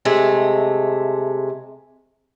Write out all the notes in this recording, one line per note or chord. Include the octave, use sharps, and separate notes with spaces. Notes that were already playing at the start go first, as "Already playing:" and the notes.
C3 G#3 A3